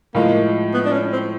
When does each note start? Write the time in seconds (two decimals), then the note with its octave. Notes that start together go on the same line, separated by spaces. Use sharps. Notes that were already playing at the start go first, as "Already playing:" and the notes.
0.15 A2 F3 G#3 A#3
0.74 B3
0.85 D4
0.92 C#4
1.12 C4